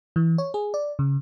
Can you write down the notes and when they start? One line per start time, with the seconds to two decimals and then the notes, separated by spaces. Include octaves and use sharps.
0.16 E3
0.38 C#5
0.54 G#4
0.74 D5
0.99 C#3